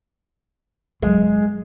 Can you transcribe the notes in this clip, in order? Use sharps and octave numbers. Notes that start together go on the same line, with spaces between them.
G1 F#3 G#3